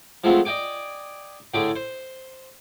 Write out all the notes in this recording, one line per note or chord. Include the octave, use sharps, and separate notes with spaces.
F3 G#3 A3 B3 C4 F4
D5 D#5 G5 G#5 D6
A2 D3 D4 G#4 G5
C5